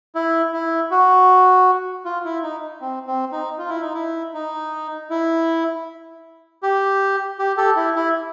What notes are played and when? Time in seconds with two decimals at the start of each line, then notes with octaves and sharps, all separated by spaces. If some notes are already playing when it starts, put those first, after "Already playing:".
0.15 E4
0.53 E4
0.91 F#4
2.05 F4
2.25 E4
2.43 D#4
2.81 C4
3.07 C4
3.32 D#4
3.58 F4
3.69 E4
3.81 D#4
3.94 E4
4.34 D#4
5.10 E4
6.63 G4
7.39 G4
7.57 G4 A4
7.76 E4
7.96 E4